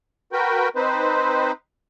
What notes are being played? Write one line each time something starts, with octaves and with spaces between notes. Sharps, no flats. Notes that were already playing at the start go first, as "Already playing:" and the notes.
F#4 A#4 B4 G5
C4 D#4 B4 C5